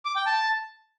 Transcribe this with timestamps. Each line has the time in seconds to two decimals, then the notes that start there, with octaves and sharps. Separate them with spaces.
0.05 D6
0.16 G5
0.26 A5